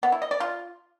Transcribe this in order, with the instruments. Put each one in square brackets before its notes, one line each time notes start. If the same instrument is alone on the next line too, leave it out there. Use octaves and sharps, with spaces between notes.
[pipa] B3
E4
D#5
D5
F4